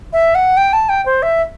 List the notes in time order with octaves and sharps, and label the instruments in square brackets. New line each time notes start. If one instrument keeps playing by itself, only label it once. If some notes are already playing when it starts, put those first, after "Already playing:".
[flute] E5
F#5
G5
A5
G5
C5
E5